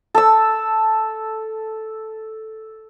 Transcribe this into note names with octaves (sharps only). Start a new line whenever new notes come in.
A4 E6